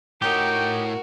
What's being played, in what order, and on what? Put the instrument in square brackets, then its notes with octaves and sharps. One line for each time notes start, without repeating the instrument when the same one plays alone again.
[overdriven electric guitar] A2 C#5 [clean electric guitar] D#4 G4 [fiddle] F#4 A#4 [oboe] G5